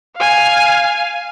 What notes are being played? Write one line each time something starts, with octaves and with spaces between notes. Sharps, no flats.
F5 G#5